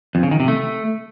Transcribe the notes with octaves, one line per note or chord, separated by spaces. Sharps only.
F2
C#3
D#3
C3
A3